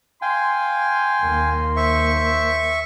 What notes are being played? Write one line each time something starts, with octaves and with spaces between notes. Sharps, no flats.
F5 G5 G#5 C6
D#2 A#3
C5 E5 C#6